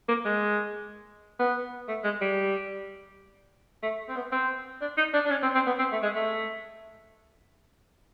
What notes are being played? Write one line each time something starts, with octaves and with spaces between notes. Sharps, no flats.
A#3
G#3
B3
A3
G#3
G3
A3
C4
B3
C4
D4
D#4
D4
D4
C#4
C4
C4
B3
C4
A3
G#3
A3